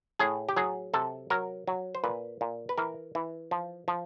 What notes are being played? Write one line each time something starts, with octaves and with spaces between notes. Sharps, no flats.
A2 G#4
G4
F#3 G#4
C3 A4
F#3 A#4
F#3
C5
A#2 B4
A#2
B4
E3 A#4
E3
F3
F3